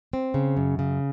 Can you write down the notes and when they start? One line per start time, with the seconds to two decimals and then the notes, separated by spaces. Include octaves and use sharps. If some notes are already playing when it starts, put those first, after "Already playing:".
0.13 C4
0.34 C#3
0.57 F#2
0.79 C#3